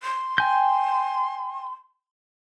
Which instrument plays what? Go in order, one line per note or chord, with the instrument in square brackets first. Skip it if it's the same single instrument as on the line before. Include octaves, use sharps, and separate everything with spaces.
[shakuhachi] C6
[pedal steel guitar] G5 G#5 G6